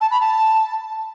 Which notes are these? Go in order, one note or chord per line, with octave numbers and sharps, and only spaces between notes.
A5
B5
A5